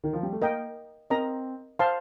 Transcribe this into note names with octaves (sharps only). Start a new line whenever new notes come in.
D#3
F3
G3
A3
A#3 A#4 D#5 G5
C4 A#4 D#5 A#5
C5 F5 A5 C6